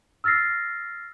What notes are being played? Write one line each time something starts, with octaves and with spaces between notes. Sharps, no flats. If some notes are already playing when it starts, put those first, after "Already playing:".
E6 F6 A6 A#6 C7